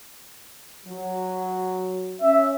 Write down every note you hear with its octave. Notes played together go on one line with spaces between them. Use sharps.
F#3
C#4 E5